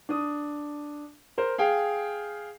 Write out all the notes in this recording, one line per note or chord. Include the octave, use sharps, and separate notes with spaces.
D4 D#6
A#4 C5
G#4 F5 G5